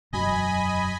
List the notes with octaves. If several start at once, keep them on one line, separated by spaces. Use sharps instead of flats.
E1 F#2 F#3 D#5 G#5 B5